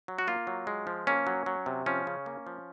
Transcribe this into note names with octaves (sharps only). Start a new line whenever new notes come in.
F#3
F#4
A#3 F4
F#3
G#3
F3
A#3 C#4
F#3
F#3
C3
F3 C#4
C#3
A#3
F3